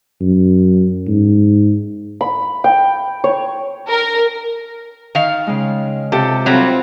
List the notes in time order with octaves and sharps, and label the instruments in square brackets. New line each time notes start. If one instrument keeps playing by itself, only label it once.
[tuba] F#2
G#2
[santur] B5
G5
C#5
[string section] A#4
[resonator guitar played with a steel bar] D#3 F5
[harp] C#3 G#3
[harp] C3 F4 G4 [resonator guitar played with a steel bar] A4
[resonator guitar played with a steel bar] F#3 G3 [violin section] C4 F4 [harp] B4